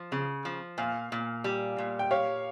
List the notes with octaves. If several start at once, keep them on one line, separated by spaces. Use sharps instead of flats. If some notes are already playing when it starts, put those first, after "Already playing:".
Already playing: F3
C#3
F3
A#2 F5 G#5
A#2
G3
A#2
G5
G4 C#5 F5